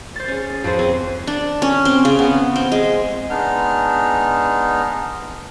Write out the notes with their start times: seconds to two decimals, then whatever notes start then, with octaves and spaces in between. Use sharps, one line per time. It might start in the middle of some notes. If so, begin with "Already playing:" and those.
0.16 C5 A6
0.28 C#4 G#4
0.64 F2 G#4 C5
0.79 C4 G#4
1.27 D4
1.62 C#4
1.85 C4
2.05 C#3
2.19 B3
2.56 C4
2.72 G#3
3.30 G#3 B3 D4 D#4 F6